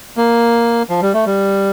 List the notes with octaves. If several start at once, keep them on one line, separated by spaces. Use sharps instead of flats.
A#3
F3
G3
A3
G3